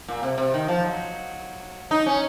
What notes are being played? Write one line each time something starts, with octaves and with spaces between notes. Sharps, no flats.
A#2
C3
C3
D#3
F3
F#3
D#4
C#4